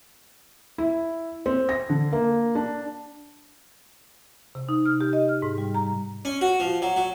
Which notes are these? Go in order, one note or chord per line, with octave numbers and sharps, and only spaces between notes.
E4
C4
A#6
D3
A#3
D4
C3
D#4
F6
G4
D#5
F6
G#2
G3
A#5
C#4
F#4
F3
F#3
F#3